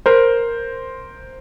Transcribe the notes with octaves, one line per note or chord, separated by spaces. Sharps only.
A#4 C5